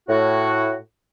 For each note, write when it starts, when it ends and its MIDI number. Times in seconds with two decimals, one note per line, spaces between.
0.08 0.75 45
0.08 0.75 66